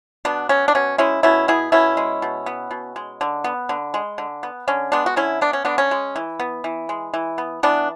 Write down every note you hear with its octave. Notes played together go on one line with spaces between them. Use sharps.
B2 B3 D4
B3 C#4
D4
B2 C#4
G#3 C#4 E4
B2 C#4 E4
B3 E4 G#4
B2 C#4 E4
G#3
B2
B3
B2
G#3
D3
B3
D3
G#3
D3
B3
D3 C#4
G#3 B3 D4
F#4
D3 C#4 E4
B3 D4
C#4
D3 B3 D4
C#4
G#3
E3
B3
E3
G#3
E3
B3
E3 B3 D4